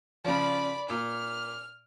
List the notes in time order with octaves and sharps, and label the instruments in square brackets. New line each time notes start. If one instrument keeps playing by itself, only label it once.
[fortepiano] C#3 F3 [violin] D5 B5
[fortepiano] A#2 [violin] F6